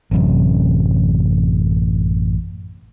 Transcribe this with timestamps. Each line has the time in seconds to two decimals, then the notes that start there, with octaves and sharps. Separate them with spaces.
0.11 A1 F#2 C3